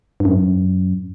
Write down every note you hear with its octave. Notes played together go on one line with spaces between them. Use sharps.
G2
F#2